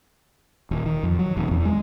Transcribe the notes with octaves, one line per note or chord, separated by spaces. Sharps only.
D#1
D#3
F2
F#3
D#1
E2
G#3